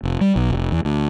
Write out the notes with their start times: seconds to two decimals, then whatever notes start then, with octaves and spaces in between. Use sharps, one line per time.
0.03 F1
0.21 G3
0.36 B1
0.50 F1
0.72 E2
0.85 D2